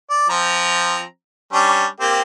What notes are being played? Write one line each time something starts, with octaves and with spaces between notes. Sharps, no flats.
D5
F3 C4 A#5
G3 C#4 D4
A#3 C4 G4